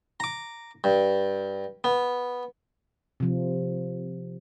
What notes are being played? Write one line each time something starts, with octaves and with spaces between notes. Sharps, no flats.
A#5 D6
G2
B3
C3 F3